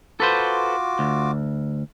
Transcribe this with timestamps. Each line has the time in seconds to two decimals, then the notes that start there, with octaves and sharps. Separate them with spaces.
0.20 F4 F#4 A4 B4 C5 D6
0.99 D2